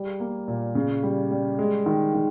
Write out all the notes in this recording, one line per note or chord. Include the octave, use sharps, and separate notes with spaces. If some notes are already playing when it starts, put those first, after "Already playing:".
Already playing: G3
A#3
A#2
C#3
G3
G3
G#3
D#3
D#3